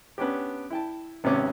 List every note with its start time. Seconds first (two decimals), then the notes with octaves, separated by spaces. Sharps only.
0.18 B3 C#4 D4 G4
0.70 E4 G5 A5
1.24 G#1 C3 B3 C#4 D6